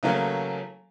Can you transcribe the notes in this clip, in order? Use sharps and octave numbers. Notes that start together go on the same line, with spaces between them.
C#3 E3 F#3 A3 A#3 C#4